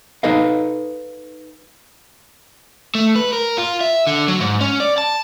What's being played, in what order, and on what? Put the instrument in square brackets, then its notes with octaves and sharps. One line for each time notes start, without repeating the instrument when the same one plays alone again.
[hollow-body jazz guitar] D#4 A4 B4 D#5 F5
[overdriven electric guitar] A3
B4
A#4
F4
E5
D3
F#3
G#2
C#4
D5
A5